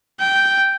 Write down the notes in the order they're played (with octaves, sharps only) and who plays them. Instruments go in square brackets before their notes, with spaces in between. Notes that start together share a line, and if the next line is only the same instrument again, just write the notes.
[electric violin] G5